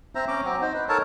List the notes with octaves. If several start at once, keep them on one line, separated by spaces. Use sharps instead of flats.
C4 C5 E5 A#5
C#4 A#5 D6
F#3 C4
D#4 C5
B4
A4 A#4 C#5 A5